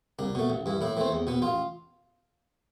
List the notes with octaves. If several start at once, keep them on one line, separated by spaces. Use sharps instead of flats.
C2 D4
B2 A3
A1
G2 E3
A2 E4
E3 A3 C4
E2
B2 B3
A1 F4